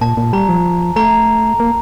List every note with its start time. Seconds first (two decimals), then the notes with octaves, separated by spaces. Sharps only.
0.01 A#2 A5
0.17 A#2
0.33 G3 A#5
0.49 F3
0.96 A3 A#5
1.60 A#3